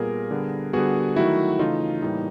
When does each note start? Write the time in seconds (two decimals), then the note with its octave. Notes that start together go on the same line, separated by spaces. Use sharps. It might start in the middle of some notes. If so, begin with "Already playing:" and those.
Already playing: A#2 G3 B3 G#4 A#4
0.31 D3 G3 B3
0.73 D3 G3 B3 F#4 G#4
1.16 D#3 F#3 A3 E4 F#4
1.59 C#3 E3 A3 D#4 F4
2.02 A2 E3 G3 A#3 D#4